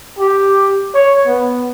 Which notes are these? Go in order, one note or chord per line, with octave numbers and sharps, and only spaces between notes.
G4
C#5
B3